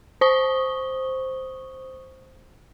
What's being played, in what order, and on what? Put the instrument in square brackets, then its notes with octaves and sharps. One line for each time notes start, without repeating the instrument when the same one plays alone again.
[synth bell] C5 C#6 D#6 G7